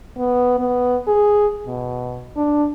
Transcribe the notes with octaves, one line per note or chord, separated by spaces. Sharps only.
B3
B3
G#4
B2
D4